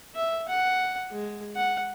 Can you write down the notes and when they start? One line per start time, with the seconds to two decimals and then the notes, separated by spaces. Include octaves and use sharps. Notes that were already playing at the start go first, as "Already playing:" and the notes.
0.15 E5
0.49 F#5
1.11 G#3
1.56 F#5